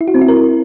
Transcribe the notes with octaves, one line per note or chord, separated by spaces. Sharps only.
E4
F#4
C4
E4
A#4